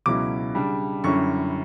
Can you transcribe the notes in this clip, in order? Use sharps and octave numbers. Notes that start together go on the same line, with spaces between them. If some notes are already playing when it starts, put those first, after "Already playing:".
C#2 B2 F#3 C#4 E4 D6
C#3 G3 D4
F#2 D3 G3 C#4 E4 C#6